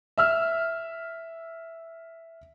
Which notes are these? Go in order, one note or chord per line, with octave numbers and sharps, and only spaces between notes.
E5 E6 F6